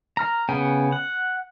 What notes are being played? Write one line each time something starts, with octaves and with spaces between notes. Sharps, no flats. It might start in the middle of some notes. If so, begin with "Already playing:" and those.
A#5 F6
C#3 B3 G5 G#5
F#5